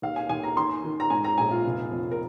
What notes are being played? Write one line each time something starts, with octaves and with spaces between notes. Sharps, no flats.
D#2 F5
G#5
D#2 G#5
A#5
D#3 C6
D#3
A#5
G#2 G#5
A#5
A#1 G#5
F4
F1
F2
A#4